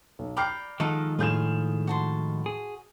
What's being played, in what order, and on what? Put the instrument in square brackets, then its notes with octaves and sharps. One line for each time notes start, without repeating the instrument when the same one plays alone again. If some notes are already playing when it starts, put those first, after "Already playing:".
[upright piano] B1
[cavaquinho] D5 G5 A#5 [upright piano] B5 F6 C7
[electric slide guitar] D#3 F3 G#3 [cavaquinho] D#4 A4 F#5
[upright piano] A2 G6 E7 [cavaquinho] F4 G#4 F5
[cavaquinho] F#4 A5 C6
[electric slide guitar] G#4